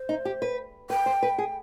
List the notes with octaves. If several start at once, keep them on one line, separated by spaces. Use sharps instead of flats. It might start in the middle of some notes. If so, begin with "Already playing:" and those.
Already playing: C5
D#4
G4
B4
B4 G5
C5
B4
G#4